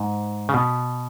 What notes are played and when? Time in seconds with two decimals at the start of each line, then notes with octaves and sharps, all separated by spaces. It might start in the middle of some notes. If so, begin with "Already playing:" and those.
Already playing: G#2
0.49 C#3
0.54 B2